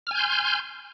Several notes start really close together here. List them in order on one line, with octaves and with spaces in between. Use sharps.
F6 G#5 G6 C6